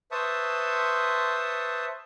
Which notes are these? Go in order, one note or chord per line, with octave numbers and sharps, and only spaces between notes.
B4 C5 E5 A5 C#6 D#6